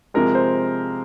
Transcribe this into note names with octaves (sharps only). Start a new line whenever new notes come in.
C3 F3 G#3 A#4
C5